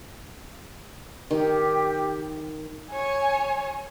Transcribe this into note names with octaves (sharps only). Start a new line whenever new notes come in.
D#3 G4
C#5 G#5